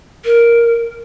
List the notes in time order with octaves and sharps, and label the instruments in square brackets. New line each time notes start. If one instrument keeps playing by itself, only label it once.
[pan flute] A#4